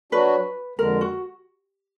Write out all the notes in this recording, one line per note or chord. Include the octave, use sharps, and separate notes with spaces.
F#3 D4 F#4 B4
F2 D3 G#3 A#4
F#4